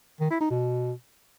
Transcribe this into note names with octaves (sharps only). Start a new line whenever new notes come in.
D#3
E4
D#4
B2